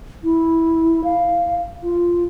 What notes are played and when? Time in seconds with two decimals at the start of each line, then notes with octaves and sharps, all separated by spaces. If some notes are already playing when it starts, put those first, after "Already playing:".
0.24 E4
1.04 F5
1.83 F4